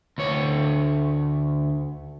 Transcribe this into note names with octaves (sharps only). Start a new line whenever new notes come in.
D2 C#5